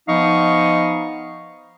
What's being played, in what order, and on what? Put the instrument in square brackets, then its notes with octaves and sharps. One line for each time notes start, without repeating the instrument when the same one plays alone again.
[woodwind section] F3 B3 D#4 D#5 F5 C#6